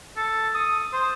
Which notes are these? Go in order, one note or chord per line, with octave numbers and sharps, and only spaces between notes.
A4
D#6
C5